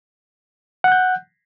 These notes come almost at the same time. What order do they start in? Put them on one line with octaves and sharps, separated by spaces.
F#5 F#6 G6